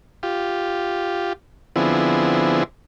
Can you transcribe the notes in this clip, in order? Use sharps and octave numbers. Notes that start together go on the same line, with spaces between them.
F4 G4
D3 F3 B3 C4 E4 G#4